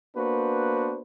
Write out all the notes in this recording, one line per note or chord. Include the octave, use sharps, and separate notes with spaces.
A#3 B3 D4 F#4 B4 C5